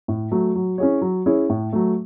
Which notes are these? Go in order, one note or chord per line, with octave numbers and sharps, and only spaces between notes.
A2
F#3 A3
F#3
C#4 E4 G#4 C#5
F#3
C#4 E4 G#4 C#5
A2
F#3 A3